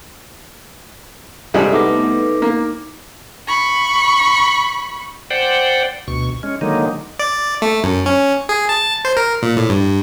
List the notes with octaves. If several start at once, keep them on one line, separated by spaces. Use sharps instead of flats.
C2 G3 G#3 E4 G#4 A4
A3 B3 D#4 D6 A#6
A#3
B5 C#6
C5 D5 F#5 G5
D2 B2 C#6
G#3 C#4
D3 D#3 F#3 G#3 A#3 D#4
D5
A3
F#2
C#4
G#4
A5
C5
A#4
A#2
A2
G2